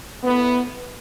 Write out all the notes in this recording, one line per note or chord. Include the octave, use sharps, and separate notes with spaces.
A2 A3 B3